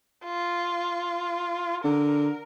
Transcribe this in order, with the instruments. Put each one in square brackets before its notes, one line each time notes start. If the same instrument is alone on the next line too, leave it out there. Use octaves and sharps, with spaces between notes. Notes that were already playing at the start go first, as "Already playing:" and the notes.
[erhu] F4
[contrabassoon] D3 [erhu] A#4